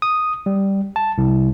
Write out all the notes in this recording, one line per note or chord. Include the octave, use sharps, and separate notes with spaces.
D#6
G3
A5
C2